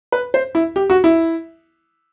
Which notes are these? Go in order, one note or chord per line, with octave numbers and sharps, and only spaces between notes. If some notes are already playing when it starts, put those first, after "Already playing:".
B4
C5
E4
G4
F#4
E4